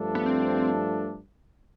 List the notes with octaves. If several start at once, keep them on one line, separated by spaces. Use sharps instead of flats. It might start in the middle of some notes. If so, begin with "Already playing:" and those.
Already playing: G2 F3 A3 D4 A4
B3
C4